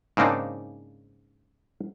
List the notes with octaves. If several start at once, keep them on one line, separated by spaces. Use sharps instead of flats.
G#2 C#3 A#3 C4 D4 D#4